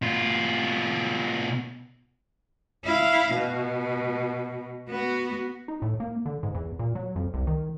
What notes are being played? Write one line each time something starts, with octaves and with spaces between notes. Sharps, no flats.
B2 F4
E4 F5
B2
B3 F#4
D#4
A2
A#3
D3
G#2
E2
A#2
F#3
F2
C2
D#3